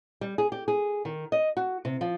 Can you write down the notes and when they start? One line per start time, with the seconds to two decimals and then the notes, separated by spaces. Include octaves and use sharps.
0.21 G3
0.38 G#4
0.52 G4
0.68 G#4
1.05 D#3
1.32 D#5
1.57 F#4
1.85 C3
2.01 F3